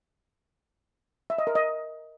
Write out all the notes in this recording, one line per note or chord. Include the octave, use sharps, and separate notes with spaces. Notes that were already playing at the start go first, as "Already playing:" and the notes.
E5
D#5
A#4
D#5